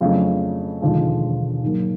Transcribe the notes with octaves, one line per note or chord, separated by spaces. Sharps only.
F2 C#3 F#3 A3 D4
E1 D#2 D3 F3 G#3
G#2 D#3 F#3 A#3